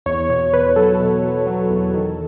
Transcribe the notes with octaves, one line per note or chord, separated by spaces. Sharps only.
E2 C#5
B2 C#5
E2 B4
F#3 A4
B2
F#3
F#3
E2
D#3